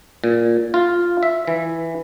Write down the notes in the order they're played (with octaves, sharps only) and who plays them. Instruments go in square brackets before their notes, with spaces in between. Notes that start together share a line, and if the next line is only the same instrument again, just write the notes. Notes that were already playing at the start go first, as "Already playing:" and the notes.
[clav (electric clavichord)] A#2
F4
E5
E3